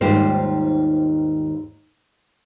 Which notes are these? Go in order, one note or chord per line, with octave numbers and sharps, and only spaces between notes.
D#2 G#2 G3 F4 G4 C5